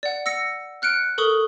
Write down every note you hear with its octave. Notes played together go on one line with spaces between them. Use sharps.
D5 F#5
E6 A#6 C#7
F6 F#6 C#7 D7
A4 A#4 C#6 D#6